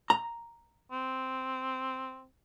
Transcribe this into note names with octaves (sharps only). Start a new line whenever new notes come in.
A#5
C4